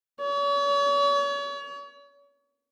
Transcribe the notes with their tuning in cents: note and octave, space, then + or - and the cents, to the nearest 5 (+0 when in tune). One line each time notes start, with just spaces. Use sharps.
C#5 +40